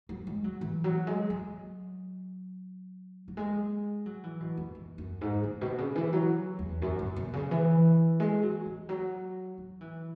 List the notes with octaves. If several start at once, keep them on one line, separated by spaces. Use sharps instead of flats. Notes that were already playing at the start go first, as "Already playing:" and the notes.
F#3
G#3
F#3
E3
F#3
G#3
F#3
F#3
G#3
F#3
E3
B2
F#2
F#2
F#2
G#2
G#2
B2
C#3
E3
F#3
E2
F#2
F#2
B2
C#3
E3
G#3
F#3
E3
F#3
F#3
E3